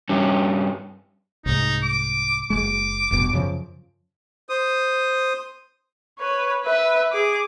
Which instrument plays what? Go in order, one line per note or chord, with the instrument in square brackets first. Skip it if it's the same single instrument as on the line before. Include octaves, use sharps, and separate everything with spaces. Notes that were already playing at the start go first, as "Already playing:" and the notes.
[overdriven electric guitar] G2 C#4
[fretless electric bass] C2 G#2 [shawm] D#4
[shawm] D6
[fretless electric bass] F#1 C#2 G#3 [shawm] D6
[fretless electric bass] F1 G2 B2
F#2 C#3 F3
[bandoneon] C5 D#6
[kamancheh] B4 C#5
B4 E5
G#4 D6